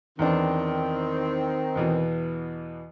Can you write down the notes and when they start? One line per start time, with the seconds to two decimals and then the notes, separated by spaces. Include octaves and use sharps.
0.19 E2 D#3 C4 D4
1.76 E2 B2 E3